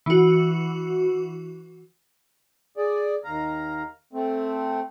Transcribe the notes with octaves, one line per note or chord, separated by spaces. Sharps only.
E3 F#4
G#4 D5
D#2 F5 A#5
A3 C4